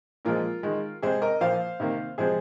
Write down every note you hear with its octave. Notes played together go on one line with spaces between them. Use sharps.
A#2 F3 G#3 F4 A#4
D#3 G#3
C3 G#3 G#4 C5
A#4 D#5
A#2 F3 A#3 C5 F5
C3 D#3 A#3
C3 F3 G#3 G#4 C5